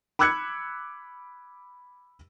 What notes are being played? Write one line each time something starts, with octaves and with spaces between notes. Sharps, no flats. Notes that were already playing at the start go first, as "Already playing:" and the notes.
B5 D6 E6 F#6 G#6 C#7